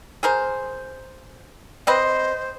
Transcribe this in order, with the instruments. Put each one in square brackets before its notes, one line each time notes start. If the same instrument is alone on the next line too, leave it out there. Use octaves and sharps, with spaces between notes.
[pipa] G#4 A#4 C5
[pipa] C4 B4 D#5 [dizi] C5